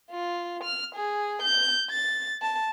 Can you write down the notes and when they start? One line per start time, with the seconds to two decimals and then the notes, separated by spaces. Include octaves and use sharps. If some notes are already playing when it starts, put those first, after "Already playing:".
0.11 F4
0.63 F6
0.95 G#4
1.42 G6
1.90 A6
2.42 A5